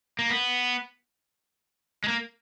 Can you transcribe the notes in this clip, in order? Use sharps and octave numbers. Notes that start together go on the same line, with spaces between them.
A#3
B3
G#3
A#3